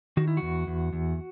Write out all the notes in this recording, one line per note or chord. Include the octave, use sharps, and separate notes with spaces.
D#3 F#4
E4
E2 F#4
E2
E2